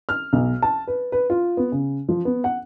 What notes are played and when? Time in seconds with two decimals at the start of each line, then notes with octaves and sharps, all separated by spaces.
0.09 F6
0.33 B1
0.62 A5
0.88 B4
1.12 B4
1.30 F4
1.57 B3
1.72 C#3
2.09 F3
2.25 B3
2.44 F#5